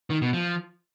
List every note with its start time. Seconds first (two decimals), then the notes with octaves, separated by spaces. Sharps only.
0.10 D#3
0.22 B2
0.33 F3